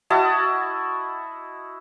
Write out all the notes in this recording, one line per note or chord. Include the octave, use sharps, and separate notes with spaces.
E4 F#4 D#5 A5